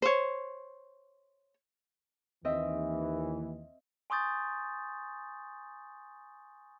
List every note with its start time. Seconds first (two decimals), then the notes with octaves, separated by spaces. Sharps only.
0.02 C5 C#5
2.45 D#2 E3 C4 D#5 E5
4.10 G#5 C6 C#6 D#6 G6 A6